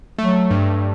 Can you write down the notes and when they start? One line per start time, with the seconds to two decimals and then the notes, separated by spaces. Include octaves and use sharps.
0.18 F#3 A3
0.51 G2